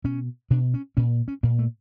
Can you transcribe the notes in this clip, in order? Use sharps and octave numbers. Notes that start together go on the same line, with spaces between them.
B2 C#4
B2 D4
C#4
A#2 C#4
C#4
A#2 A#3
A3